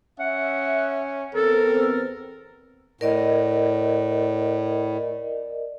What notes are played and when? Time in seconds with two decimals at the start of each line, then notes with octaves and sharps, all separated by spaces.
0.20 C#4 E5 F#5
1.35 E2 B3 C4 A4 A#4
3.01 A2 A#4 D5 D#5